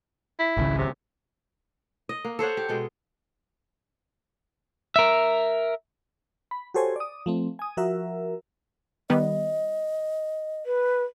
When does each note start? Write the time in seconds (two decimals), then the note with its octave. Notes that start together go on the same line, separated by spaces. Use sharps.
0.39 E4
0.57 G#1 C#2 C#3
0.78 C3
2.09 D#5
2.24 A#3
2.39 A4 C5 C#5 F#5
2.57 G4
2.69 B2 G#3 A4
4.96 A#4 E5
6.51 B5
6.74 F#4 G4 A4 C5 C#5 G#5
6.96 D5 D#6
7.26 F3 A3 C4
7.59 G#5 D#6
7.77 F3 F#4 A#4 E5
9.10 D#3 G3 B3 D#5
10.66 B4